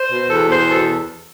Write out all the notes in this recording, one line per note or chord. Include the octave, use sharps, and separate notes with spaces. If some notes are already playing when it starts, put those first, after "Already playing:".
Already playing: C5
B2
E2 A4
E2 C5
B2 A4